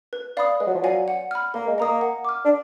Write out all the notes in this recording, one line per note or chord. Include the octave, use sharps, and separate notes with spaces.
B4
D5 F5 B5 D#6
G#3 B4
F#3
F3
F#3 D5 F5 G#5
F#5
B5 F6
A#3 A#4
G#3
A#3 D#5 A#5 D#6
F#5
D6 F6
D4